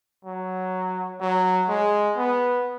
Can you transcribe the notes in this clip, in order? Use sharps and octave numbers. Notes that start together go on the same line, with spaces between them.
F#3
F#3
G#3
B3